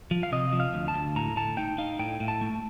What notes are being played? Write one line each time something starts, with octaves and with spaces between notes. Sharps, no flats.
F3
F5
C3 D#5
F3
F5
D2
A5
D2
A2 A#5
A2 A5
D#4 G5
D#4 F5
A2 G5
A2
A5
A3